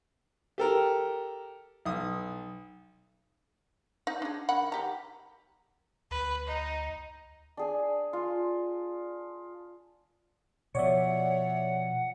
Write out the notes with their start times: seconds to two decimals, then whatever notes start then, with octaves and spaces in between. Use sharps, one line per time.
0.58 G4 A4 A#4
1.86 B1 D#6
4.07 D#4 F#5
4.22 D4 G#4
4.49 D#3 F#5 B5
4.72 D#3 G4 A#5
6.11 D2 B4
6.47 D#4
7.57 D4 G#4 G#5
8.13 F4
10.75 B2 F3 C#5 D5 E5 F#5